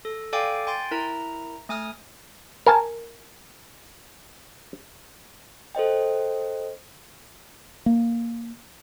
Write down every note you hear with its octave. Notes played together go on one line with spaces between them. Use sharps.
A4
A4 D5 F5 G5 G#5 D6
G5 G#5 C6 A6
E4 A#4 A#5
A3 G#5 D#6 F6
A#4 G#5 A5
A4 C5 D#5 G5
A#3